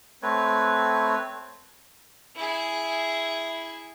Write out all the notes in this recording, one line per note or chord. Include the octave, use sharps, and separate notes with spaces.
A3 C4 B4 C#5
E4 G#4